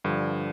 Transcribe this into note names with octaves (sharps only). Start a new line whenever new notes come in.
G2 D3 F3